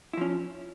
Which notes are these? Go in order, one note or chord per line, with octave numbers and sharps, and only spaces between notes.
F3 C#4 E4